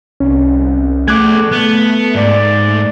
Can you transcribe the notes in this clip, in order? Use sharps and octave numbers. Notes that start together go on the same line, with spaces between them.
C2 C#4
A3 G#4 D5 D6 F#6 G#6
B3 F#6
G#2 D5
A3